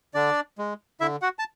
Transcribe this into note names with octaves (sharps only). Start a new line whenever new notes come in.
D3 D4 D5
G#3
D3 E4 E5
F#4 F#5
A5